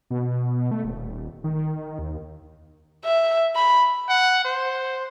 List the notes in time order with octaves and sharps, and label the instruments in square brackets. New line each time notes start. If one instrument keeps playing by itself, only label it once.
[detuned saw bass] B2
A3
D#1
D#3
D#2
[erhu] E5
B5
[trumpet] F#5
C5